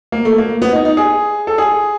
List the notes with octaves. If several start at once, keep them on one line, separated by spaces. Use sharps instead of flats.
A#3
A3
A#3
B3
D#4
D#4
G#4
A4
G#4